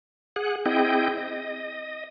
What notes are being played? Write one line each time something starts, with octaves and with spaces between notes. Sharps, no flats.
G#4 F#5
C4 E4 G#4 D#5 G5
D#5